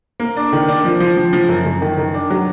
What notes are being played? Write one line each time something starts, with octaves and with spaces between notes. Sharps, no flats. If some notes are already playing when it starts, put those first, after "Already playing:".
A#3
D4
D#3
D4
F3
F3
F3
F3
F#2
F#2
D#3
D#3
D4
F#3